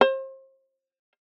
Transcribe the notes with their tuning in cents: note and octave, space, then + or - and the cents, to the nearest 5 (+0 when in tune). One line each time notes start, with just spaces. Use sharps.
C5 +35